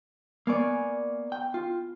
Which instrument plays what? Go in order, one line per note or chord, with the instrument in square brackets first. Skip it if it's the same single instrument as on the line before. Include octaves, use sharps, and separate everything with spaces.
[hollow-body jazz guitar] A#3 D5 [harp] B3 G#5 C#6
[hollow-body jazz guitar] G5
F4